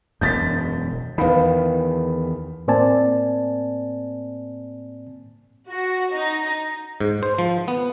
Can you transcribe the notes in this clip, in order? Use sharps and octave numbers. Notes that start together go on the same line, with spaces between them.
E1 F#2 G6 A6 B6
E2 D#3 B4 F5 B5
A2 A#3 C4 D5 G#5 A5
F#4
D#4
G#2
C5
F3
B3